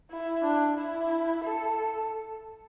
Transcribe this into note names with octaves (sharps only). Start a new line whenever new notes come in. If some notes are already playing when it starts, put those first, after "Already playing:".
E4
D4
E4
A4